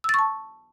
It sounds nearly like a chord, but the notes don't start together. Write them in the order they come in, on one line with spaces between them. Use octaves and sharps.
E6 A6 C#6 A5